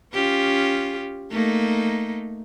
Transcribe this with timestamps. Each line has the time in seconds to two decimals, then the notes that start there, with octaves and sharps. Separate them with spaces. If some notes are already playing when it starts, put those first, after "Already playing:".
0.14 C#4 F4 G4
1.31 A3 A#3 D#4